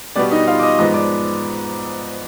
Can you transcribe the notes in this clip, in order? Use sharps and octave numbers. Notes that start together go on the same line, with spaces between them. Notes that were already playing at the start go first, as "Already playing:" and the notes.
B2 G3 B3 D5
D#4 D#5
F4 F5
D6
D#5 D#6
G#2 F3 G#3 B3 D#5 D#6
D5 D6